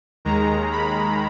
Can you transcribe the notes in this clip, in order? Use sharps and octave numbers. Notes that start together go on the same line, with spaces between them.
D#2 D#3 G#3 A#5
B5